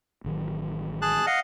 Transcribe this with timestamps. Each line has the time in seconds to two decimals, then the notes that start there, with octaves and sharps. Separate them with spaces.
0.24 A1 D#3 F#3
1.02 G#4 A5 F#6
1.27 D#5 F5 F#5